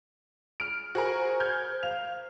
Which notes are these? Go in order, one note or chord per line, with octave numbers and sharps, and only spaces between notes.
F6 D7
F#4 G#4 A#4 C5
F6 G6 G#6
F5 F7